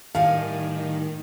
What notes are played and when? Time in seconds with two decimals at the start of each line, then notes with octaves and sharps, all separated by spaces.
0.15 A2 D#3 G3 F5 G#5